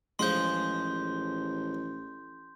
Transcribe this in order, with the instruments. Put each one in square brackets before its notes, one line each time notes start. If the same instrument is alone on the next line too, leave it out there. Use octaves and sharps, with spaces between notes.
[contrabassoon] A1 [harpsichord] F3 G#3 [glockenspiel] C6 G6